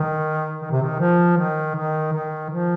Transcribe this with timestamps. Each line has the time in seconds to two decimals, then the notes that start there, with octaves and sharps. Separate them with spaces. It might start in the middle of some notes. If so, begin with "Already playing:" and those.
Already playing: D#3
0.62 D#3
0.71 C3
0.82 D#3
1.00 F3
1.37 D#3
1.75 D#3
2.13 D#3
2.50 F3